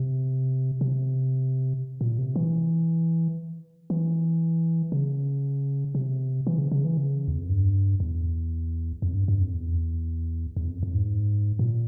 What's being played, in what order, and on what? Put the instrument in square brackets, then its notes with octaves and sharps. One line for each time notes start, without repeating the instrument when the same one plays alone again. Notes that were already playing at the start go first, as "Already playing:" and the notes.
Already playing: [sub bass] C3
C3
A#2
C3
E3
E3
C#3
C3
E3
C#3
C#3
E3
C#3
E2
F2
G2
E2
F2
G2
G2
F2
E2
E2
F2
F2
G#2
A#2